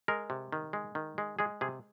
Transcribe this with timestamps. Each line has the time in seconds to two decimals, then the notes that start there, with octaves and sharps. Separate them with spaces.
0.08 G#3 A#4
0.30 C3
0.52 D#3
0.73 G#3
0.95 D#3
1.18 G#3
1.39 G#3 G#4
1.61 C3 G#4